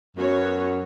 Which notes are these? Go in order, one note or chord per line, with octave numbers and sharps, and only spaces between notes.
F#2 B3 F#4 C#5